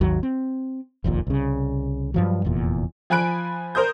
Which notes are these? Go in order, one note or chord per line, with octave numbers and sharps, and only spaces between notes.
G#1 D#2 F#3
C4
F1 A#1 D#2 A#2
C2 C#3
G2 F3 F#3
F1 E2 A#2
F3 G#5 B5 F#6 D7
A#4 C5 D#6 G6